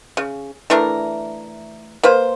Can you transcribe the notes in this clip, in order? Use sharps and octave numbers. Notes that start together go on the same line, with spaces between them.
C#3
E3 A3 D4 A#4
A#3 B4 C5